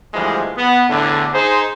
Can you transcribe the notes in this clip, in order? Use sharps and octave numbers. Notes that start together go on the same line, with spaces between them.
D2 E3 F3 G3 G#3
B3
E2 A2 D3
D#4 G#4 C5